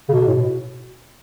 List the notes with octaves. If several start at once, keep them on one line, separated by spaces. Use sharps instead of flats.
C#3
B2
A2
B2